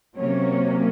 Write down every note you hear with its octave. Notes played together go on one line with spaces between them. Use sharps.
C3 F#3 A#3 C#4 C#5